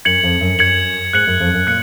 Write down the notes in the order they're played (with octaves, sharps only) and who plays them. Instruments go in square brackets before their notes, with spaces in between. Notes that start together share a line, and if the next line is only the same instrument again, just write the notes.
[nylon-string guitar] F#2 [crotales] G#6 C#7 F#7
[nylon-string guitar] F2
F#2
[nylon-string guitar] F#2 [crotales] G#6 C#7 F#7
[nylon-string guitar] G#2 [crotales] F#6 C#7 F#7
[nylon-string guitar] F#2
F2
F#2
[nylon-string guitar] A#2 [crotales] F#6 C#7